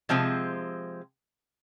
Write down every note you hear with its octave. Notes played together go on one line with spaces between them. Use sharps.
C3 F3 G#3 C4